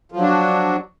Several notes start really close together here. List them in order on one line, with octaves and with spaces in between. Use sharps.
F3 F#3 D4 F#4